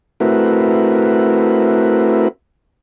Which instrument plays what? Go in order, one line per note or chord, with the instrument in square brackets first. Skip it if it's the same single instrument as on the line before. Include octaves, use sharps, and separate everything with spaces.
[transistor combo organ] A3 C4 E4 F#4 A#4 B4